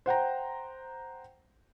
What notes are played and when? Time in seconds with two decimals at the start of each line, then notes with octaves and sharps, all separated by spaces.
0.06 C5 F#5 G5 A#5